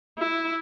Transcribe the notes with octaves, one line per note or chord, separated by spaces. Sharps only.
E4